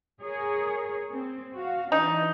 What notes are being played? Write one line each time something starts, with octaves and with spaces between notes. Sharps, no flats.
G#4 A#4 C#5
C4
F#4 F5
E3 D4 D#4